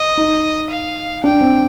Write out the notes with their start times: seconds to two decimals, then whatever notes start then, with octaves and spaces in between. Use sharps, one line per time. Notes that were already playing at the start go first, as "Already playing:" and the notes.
Already playing: D#5
0.17 D#4
0.70 F5
1.24 D4 G5
1.41 C4